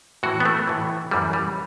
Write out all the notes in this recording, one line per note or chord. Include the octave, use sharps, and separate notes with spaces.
A2 E3 F#4
B3
A3
A2 E3
F#2 E3 G3
G3